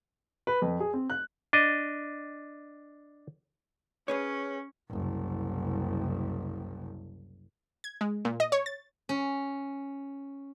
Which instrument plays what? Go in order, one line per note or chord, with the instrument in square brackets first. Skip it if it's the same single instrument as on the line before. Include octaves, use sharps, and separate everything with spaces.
[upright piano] B4
F2
G#4
C4
F#6
[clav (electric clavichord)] D4 D#5
[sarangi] C#4 [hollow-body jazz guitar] G#4 B4 C#5
[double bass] F#1 C2
[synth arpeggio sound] G#6
G#3
A#2
D#5
C#5
A6
[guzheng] C#4